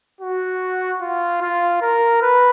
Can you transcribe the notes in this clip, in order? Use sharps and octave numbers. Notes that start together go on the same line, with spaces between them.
F#4
F4
F4
A#4
B4